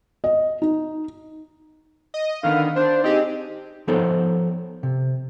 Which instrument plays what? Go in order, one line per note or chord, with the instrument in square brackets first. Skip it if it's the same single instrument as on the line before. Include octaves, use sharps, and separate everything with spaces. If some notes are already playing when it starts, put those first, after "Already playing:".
[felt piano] D#5
D#4
[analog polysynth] D#5
[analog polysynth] D3 D#3 B3 [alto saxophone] F5
[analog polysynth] D4 [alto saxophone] C5
[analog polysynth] C4 G4 G#4 [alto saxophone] D#4
[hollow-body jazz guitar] F3 B3 D#4 A4 C5 C#5
C3